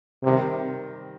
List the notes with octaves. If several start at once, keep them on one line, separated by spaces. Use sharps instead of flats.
C3 D#3 G3 C4